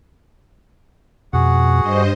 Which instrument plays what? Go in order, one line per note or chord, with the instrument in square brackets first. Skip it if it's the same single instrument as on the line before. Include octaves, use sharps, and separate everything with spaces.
[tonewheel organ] F2 B2 [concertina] F#4 G#4 F#5
[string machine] G2 C5 D#5